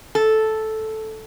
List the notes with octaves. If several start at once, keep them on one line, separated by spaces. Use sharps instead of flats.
A4